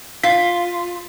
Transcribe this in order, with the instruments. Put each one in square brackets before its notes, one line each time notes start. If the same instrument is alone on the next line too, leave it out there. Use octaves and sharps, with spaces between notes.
[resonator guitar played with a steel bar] F4 [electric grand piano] B6